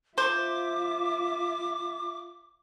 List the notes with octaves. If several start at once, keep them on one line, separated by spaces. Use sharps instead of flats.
F4 C5 E5 D6